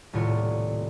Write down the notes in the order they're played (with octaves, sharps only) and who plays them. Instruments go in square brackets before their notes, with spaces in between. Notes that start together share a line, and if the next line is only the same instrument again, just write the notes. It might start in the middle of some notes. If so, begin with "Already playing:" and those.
[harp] D#1 C2 A2 F4 C#5